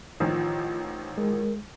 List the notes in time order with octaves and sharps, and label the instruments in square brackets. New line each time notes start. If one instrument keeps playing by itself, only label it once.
[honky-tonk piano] A1 D#3 F3 [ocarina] F4
[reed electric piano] G#3 [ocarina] A#4